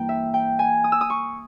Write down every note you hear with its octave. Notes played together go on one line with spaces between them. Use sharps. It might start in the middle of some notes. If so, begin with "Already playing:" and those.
Already playing: G2 E3 A#3 E4 G5 A#5
E5
G5
G#5
D#6
E6
D#6
C#6